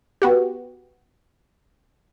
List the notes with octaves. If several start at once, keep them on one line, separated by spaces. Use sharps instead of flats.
B3 F#4 G4